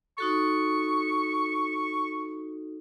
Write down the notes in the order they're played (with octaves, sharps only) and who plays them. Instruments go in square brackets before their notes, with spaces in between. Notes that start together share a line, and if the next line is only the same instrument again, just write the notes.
[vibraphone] D#4 F#4 A4 [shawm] C#6